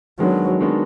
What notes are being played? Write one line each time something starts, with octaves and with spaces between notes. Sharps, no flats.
D#3 F#3 G#3 B3 D4 F#4
D#3 G#3 B3 D4 F#4